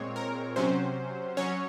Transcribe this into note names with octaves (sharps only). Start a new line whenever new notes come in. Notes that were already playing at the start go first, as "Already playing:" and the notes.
Already playing: A#2 G#3 C4 C#5
A#4
C3 F#3 C#4 C5
F#3 C#4 C#5